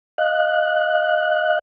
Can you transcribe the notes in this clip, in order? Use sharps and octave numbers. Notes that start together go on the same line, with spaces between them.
D#5 F5 F#6